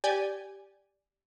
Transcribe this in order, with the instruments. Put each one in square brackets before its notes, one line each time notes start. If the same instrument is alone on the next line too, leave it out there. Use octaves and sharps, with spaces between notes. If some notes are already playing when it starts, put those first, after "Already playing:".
[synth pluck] G4 D5 G#5